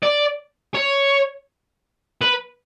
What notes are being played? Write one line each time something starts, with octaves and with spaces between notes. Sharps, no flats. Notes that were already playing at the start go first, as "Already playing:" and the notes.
D5
C#5
B4